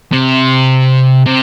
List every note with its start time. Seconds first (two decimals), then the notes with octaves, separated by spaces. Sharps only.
0.12 C3
1.26 C3